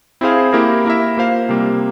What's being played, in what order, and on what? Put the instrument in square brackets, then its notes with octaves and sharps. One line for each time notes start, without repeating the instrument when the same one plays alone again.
[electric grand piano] C4 E4 G#4 C5 F5
A#3 E4 G4 A#4
A#3 E4 A#4 E5
A#3 F4 C5 F5
C3 G3 A#3